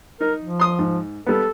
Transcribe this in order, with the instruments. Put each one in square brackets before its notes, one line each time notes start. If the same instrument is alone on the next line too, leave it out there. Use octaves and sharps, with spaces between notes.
[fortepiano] D#4 [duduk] A#4
[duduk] F3
[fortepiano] C6 D#6
G#2
[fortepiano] G3 B3 [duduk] A4